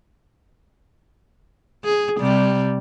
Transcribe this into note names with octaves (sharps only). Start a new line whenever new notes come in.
G#4
C3 G3